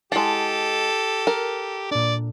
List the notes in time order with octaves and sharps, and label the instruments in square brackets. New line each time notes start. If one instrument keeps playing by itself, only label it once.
[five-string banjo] G#3 A5 [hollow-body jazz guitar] E4 F#5 [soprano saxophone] G4 [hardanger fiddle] A4
[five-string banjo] A#4
[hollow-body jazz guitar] A#2 D4 [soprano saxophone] D5